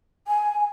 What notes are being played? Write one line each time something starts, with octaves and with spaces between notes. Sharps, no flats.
G#5